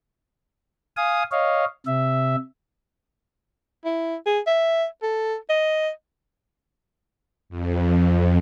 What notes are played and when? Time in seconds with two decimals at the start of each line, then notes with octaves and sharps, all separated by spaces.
0.97 F5 G#5 D#6
1.31 C#5 D#5 F5
1.86 C3 E5
3.85 E4
4.26 G#4
4.47 E5
5.02 A4
5.49 D#5
7.49 F2